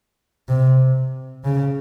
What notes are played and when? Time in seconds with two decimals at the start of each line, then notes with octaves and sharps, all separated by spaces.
0.49 C3
1.45 C#3